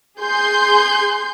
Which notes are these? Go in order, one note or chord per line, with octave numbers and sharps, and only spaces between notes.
G#4 C6 G6